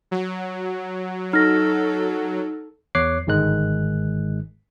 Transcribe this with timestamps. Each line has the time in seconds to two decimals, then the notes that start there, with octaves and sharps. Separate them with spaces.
0.11 F#3
1.33 D#4 A4 F6 A#6
2.95 E2 C#5 D6 F#6 C7
3.27 G1 G#2 D#3 G#3 F#6